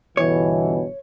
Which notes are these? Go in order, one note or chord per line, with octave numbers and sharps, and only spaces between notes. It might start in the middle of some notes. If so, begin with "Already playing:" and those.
G1 B2 E3 C#5